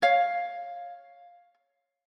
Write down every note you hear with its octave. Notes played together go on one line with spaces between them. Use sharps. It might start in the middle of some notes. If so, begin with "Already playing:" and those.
C#5 F5